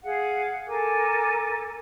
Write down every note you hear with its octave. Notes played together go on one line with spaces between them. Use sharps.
G#4 F5 F#5
A4 A#4 G#5 D6